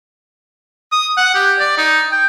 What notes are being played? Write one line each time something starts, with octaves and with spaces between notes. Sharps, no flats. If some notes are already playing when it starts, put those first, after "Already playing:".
D#6
F#5
G4
D5
D#4
G5